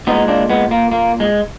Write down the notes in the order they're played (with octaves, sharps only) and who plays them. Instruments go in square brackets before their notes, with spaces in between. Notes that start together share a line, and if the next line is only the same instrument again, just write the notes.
[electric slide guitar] A#2 G#3 B3 D#4
A#3 D4
G#3 B3
A#3
A#3
G#3